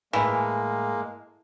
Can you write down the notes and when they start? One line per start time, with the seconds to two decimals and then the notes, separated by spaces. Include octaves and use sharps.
0.13 A2 E3 G#3 A#3